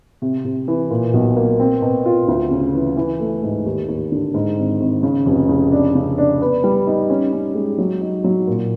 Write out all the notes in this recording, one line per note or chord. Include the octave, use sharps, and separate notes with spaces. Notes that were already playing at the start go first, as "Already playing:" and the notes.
C3
C3
E3
A#2
B1
A#3
C4
B2
F4
D2
C#3
E3
E3
A3
G#2
D#2
D#2
D3
G#2
G#1
G#1
C#3
F1
C#3
D4
C#3
D4
B3
G3
D#4
C#4
C#4
G#3
F#3
D#4
F#3
A#2